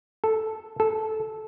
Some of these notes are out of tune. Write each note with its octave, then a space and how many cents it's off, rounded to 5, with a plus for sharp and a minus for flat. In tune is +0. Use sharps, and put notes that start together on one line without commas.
A4 -5
A4 -15